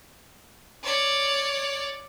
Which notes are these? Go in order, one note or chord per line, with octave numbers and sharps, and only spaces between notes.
C#5 D5